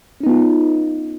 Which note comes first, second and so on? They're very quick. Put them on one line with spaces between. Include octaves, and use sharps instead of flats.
C#4 D#4 B3 F4